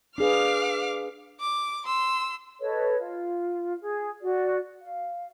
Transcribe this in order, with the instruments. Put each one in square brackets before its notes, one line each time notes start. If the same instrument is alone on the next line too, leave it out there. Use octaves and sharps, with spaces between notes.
[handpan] D4 G#4 B4 [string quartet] F5 D6 F6
[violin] D6
C6 E6
[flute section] A4 B4 C#5 D#5
F4
G#4
F#4 D5
F5